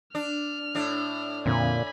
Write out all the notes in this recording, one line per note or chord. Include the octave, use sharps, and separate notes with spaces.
D4 F6
A2 D4
F2 A#2 D3 C4 G#5 B5